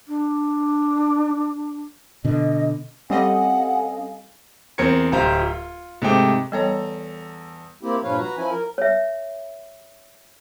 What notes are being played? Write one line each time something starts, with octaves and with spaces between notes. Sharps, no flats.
D4
B2 D3 D#5
G3 C4 C#4 A4 D#5 F5 F#5 G#5
E2 C4 A#4 G#6 C#7
D1 G4 C5 F5 A#5
F4
G#2 C3 A3 G5 D6
E2 G3 B3 A4 C#5 A#5
A#3 C4 E4 G4
G2 A#2 F3 B4 C#5 F5
F#4 B4 A#5
F3 C#4 E4 G#5
A#4
C#5 E5